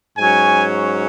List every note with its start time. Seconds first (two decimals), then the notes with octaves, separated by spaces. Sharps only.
0.18 G#2 F#3 C#4 G#5